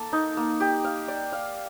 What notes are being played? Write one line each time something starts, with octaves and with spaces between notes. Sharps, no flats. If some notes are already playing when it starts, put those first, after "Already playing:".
Already playing: A#3 A4
D#4
A#3
G4
F5
D5
F5